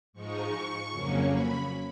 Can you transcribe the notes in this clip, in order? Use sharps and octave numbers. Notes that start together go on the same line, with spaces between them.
G#2 F3 G#3 D#4 C#6
F2 C#3 F#3 A#3 C#4
B5